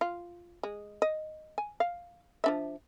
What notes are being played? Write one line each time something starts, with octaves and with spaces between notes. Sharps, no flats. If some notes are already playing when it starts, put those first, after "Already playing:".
F4
G#3
D#5
G#5
F5
F3 D4 E5